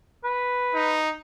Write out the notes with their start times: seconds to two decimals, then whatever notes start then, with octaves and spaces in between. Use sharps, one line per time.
0.24 B4
0.74 D#4